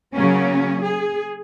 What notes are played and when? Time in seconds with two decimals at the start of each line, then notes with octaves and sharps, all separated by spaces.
0.14 C#3 F#3 A#3 C#4
0.84 G#4